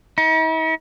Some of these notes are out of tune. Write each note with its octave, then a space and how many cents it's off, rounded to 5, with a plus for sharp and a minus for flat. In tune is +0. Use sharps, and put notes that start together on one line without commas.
D#4 +45